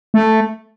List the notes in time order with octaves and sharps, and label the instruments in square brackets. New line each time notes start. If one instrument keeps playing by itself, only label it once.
[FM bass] A3